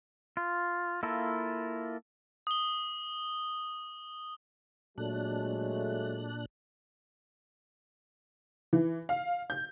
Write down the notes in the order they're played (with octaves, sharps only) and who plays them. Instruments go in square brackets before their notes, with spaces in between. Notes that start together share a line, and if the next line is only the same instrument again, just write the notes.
[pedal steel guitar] F4
A#3 E4 F4 A4
[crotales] D#6 G7
[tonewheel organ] A#2 D4 F#6 [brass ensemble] F#3 G#3 A3
[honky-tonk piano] E3
F5
G6